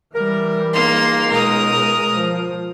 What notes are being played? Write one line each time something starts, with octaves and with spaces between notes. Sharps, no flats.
E3 G3 A#4
C#2 A#3 D#4 C6
B2 G#3 A#4 D#6
F3